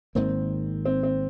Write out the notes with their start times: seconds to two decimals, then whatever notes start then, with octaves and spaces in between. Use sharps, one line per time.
0.15 G#1 G#2 D#3 A#3 C4
0.85 C4
1.03 C4